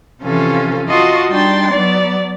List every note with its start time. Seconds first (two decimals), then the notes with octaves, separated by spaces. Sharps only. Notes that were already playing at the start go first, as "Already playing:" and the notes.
0.22 C3 E3 F3 C#4 F4 A4
0.88 F4 F#4 D#5 A5 C6
1.30 G3 D4 D#4 G5 C6 A6
1.71 F#3 B3 D5